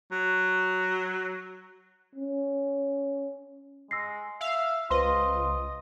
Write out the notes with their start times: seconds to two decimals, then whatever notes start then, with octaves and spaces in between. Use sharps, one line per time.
0.12 F#3
2.15 C#4
3.91 G#3 E6 A#6 C7
4.41 E5 F5
4.90 C#2 F4 B4 C5 D#5 C6